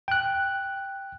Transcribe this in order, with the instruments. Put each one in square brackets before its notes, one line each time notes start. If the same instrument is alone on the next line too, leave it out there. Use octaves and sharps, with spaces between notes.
[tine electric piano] G5 F#6